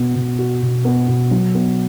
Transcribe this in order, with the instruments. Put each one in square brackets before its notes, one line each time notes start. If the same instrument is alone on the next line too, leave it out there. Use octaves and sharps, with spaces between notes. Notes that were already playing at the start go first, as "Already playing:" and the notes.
Already playing: [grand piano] B2 B3 F#4
B2
F#4
B2
B3
B2
F#3
B3